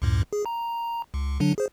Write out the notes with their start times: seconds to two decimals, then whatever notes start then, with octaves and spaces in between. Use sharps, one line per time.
0.02 C#2 F#2 A2
0.33 G#4
0.46 A#5
1.14 C#2
1.40 D3 F#3 D4
1.58 G#4 C5